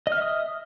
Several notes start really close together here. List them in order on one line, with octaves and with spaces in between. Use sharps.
D#5 F6 E5 D#6